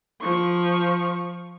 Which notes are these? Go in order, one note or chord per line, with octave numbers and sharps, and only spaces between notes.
F3 C#6